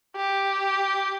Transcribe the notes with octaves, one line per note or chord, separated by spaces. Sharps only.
G4